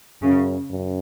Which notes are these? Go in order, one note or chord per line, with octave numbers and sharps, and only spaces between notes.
F#2 C#3
F#2